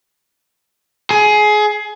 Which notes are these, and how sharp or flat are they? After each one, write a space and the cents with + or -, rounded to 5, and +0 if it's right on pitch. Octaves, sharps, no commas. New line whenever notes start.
G#4 +20